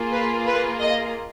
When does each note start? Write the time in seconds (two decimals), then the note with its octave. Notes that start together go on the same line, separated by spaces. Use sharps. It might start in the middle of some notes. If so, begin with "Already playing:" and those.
Already playing: A#3 F4 G#4
0.13 B4
0.46 B4
0.80 D#5